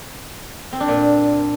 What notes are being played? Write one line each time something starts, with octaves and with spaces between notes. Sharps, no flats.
C4
D4
A#2